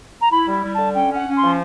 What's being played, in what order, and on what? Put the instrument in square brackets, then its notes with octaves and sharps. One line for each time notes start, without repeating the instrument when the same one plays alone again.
[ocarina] A#5
[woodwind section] E4 [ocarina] B5
[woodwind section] G3
G3
[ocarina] A5
[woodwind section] D3
[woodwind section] C#4 [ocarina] G5
[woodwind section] C#4 [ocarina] F#5
[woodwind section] C#4
[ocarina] C6
[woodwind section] F3